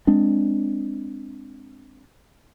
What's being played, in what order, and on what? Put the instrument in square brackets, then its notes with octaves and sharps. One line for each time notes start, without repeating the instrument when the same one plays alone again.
[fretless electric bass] G#3 C4 D4